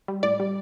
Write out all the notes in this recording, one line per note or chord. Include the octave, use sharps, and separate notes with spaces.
G3
A2 D5
G3